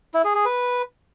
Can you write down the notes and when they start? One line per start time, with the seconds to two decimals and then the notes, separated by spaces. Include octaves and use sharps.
0.14 E4
0.25 G#4
0.35 G#4
0.45 B4